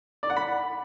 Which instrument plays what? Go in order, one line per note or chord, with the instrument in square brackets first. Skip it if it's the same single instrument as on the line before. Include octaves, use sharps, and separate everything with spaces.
[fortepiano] D5
F#5
B5